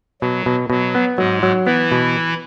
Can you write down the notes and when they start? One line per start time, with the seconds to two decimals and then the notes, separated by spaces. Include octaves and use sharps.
0.21 B2 F#3
0.46 B2
0.70 B2 F#3
0.95 B3
1.18 G#2 F#3 G#3
1.43 F#3
1.66 E3 B3 E4
1.92 B2